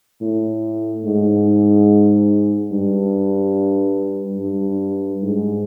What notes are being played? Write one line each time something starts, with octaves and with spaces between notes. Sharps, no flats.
A2
G#2
G2
G2
G#2